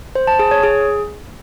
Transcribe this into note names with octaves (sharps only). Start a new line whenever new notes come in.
C5
A5
G#4
C#5
G#4